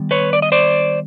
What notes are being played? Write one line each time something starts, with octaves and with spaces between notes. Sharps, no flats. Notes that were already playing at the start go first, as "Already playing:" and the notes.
Already playing: D#3 G3 B3
B4 C#5
D5
D#5
C5 D5